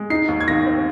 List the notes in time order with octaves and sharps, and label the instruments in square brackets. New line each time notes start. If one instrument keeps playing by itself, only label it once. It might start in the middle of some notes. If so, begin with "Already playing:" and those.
Already playing: [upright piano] G#3
D#4 C7
D#2
G#6
D#3 A#6
C4